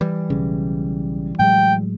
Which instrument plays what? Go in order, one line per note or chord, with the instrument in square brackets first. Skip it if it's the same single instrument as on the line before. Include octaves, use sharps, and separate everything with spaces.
[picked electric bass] E3 G3
[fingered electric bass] B1 C#3
[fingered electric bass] A2 F#3 G#3 [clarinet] G5